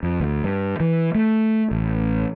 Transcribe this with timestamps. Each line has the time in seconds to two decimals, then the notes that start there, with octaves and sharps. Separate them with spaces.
0.03 F2
0.20 D2
0.44 G2
0.80 E3
1.15 A3
1.71 A1